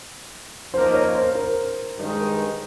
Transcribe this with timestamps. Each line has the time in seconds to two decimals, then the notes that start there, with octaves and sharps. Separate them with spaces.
0.74 F3 A#3 D#4 A#4 C5
0.94 C#5
1.15 C5
1.35 A#4
1.98 G2 D#3 G#3 D#4